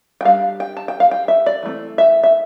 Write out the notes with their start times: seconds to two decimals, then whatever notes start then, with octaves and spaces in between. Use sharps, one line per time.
0.21 G5
0.25 G3 D4 F5
0.60 G5
0.77 A5
0.88 G5
1.00 F5
1.11 G5
1.28 E5
1.46 D5
1.63 E3 A3 C4
1.98 E5
2.23 E5